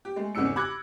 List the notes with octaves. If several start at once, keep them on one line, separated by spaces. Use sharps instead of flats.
G4
G#3 A3
G#1 E2 C#3 D#4 E6 C#7
B5 D6 E6 F#6 G#6 A#6